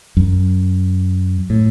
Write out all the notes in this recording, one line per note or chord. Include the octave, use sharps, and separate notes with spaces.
F#2
A2